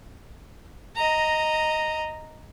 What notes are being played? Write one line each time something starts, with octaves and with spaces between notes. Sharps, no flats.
D#5 A#5